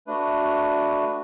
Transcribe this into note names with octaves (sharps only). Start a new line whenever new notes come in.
A3 D4 F#4 B4